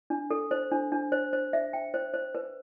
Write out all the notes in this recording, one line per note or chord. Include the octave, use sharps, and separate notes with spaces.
D4
A4
C5
D4
D4
C5
C5
E5
G5
C5
C5
B4